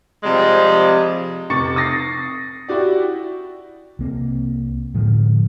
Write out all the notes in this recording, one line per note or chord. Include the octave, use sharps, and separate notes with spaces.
C3 F3 G3 G#3
F1 C3 C#6 A6 C#7
D#6 A6 A#6 C7
E4 F#4 G4 D5
C2 A#3 C4
A2 D3 F3 G#3